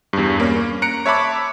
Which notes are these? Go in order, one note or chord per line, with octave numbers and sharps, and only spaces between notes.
E2 G2
A#3 C#4
A#5 F#6 C#7 D7
C#5 E5 A5 B5 D6